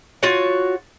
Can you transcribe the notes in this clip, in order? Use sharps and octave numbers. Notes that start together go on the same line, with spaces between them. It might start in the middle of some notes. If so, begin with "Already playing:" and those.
F4 F#4 C#5